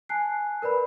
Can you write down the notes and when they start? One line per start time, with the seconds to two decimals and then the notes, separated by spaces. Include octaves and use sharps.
0.09 G#5 A5 F#6 C7
0.62 A#4 B4 D5 B5